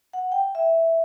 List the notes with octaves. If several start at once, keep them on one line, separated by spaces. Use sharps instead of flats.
F#5
G5
E5